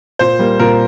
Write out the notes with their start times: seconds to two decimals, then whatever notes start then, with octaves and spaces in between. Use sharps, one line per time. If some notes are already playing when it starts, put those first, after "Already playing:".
0.19 A#2 C5
0.39 G3 A#3
0.59 A#2 A#4